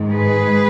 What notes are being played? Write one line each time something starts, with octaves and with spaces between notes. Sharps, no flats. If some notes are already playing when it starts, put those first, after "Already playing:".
Already playing: G#2 D#3 G#3
G#4 B4